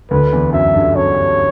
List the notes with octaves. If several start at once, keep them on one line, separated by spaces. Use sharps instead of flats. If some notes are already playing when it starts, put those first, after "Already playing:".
D2 D3 B4
E2 E3
F#2 E5
G2
F#2 C#5